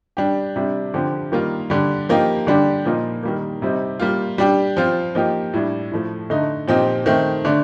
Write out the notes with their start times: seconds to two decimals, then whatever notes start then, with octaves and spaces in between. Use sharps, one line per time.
0.17 G3 D4 G4
0.56 C3 G3 D4
0.94 D3 F3 C4 G4
1.32 D#3 G3 A#3 F4
1.70 D3 G3 D4
2.09 F3 A#3 D#4 G4
2.47 D3 G3 D4 G4
2.85 A#2 F3 A#3 D#4
3.23 D#3 G3 A#3
3.62 C3 G3 C4 D#4
3.99 G3 A#3 F4
4.38 G3 D4 G4
4.77 F3 C4 F4
5.15 F3 A#3 D#4 G4
5.54 A2 G3 D4
5.92 A2 F3 A3
6.30 D3 A3 D#4
6.68 A#2 F3 C4 D#4 G4
7.06 D#3 A3 C4
7.45 D3 A3 D4